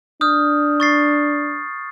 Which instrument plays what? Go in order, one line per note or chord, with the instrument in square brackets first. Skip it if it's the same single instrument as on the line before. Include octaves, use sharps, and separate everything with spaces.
[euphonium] D4 [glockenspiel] D#6 F6 G6
[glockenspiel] C#6 A6 C7